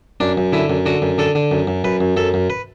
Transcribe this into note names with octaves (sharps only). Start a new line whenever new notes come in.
F#2 D4
F#2
D3 E4
F#2
D3 F#4
F#2
D3 A4
D3
F#2
F#2
F#2 B4
F#2
F#2 A4
F#2
B4